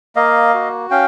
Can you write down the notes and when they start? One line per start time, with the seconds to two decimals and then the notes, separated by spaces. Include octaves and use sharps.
0.16 A#3 D#5 F5
0.54 F#4
0.91 C#4 F5 G5